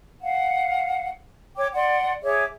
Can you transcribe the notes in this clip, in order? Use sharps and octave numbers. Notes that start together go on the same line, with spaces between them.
F5 F#5
C#5 G5 D6
D5 F#5 C6
G#4 C#5 E5 D6